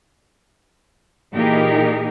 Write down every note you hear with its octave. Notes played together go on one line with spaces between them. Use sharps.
A#2 E3 D#4 G4 G#4 A#4